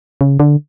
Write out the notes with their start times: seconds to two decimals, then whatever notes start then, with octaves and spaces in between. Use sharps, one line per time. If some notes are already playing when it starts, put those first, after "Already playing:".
0.21 C#3
0.40 D3